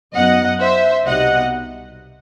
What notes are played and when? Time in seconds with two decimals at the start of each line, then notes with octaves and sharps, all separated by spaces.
0.14 F#2 F#3 B3 D#4 D#5 F#5
0.60 C5 E5
1.05 C2 B2 G3 D#4 D#5 F#5